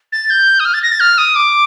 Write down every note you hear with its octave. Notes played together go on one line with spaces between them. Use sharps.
A6
G6
D#6
F6
A6
A#6
A6
F6
D#6
D6